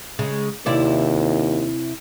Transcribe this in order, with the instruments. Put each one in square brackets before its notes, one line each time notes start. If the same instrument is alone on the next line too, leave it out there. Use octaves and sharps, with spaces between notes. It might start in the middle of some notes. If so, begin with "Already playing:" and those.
[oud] C#3 G#3
[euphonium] D#2 [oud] C3 E4 D5